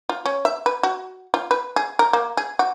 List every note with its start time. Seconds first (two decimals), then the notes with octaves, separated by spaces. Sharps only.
0.09 F4
0.26 C#4
0.45 E5
0.66 B4
0.83 F#4
1.34 F4
1.51 B4
1.76 G#4
1.99 A#4
2.13 A#3
2.37 G#4
2.59 F#4